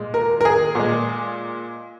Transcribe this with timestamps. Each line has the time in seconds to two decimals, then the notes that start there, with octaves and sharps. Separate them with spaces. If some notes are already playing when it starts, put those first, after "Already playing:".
Already playing: A#2 G#3
0.14 A#4
0.41 A#4
0.45 G#4
0.75 A#2 G#3